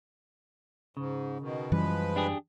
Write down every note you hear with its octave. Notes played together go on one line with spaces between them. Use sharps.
G#2 C#3
B2 D#3
F#2 E3 F3 G3 G#3 B4
D4 G4 G#4